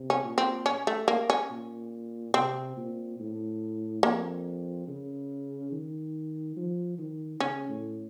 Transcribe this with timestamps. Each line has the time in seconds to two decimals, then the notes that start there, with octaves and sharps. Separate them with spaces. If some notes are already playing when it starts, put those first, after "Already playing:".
Already playing: C3
0.10 C#4
0.24 A#2
0.38 C4
0.66 C#4
0.87 A3
1.08 A#3
1.30 C#4
1.50 A#2
2.34 C3 C4
2.77 A#2
3.19 A2
4.03 F2 A#3
4.88 C#3
5.72 D#3
6.56 F3
6.98 D#3
7.40 C#3 C#4
7.68 A2